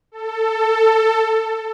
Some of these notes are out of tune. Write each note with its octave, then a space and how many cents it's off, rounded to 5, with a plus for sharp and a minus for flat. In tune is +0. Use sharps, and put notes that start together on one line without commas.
A4 +15